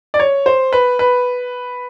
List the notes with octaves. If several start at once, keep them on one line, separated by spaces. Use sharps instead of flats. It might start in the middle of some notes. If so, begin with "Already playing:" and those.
D5
C#5
C5
B4
B4